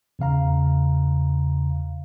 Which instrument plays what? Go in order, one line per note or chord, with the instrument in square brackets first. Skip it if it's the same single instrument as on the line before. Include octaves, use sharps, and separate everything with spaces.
[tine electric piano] E2 C#3 F5 A#5